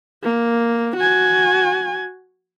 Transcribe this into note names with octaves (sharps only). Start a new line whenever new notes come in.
A#3
F#4 G#5